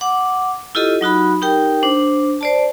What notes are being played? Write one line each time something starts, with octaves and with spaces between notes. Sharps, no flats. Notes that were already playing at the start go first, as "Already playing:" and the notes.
F#5 D6
E4 F4 G4 A4 D#5
F#3 D#4 F#4 B5
D#4 G4 A#4 G5
D4 C5
C5 D5 A5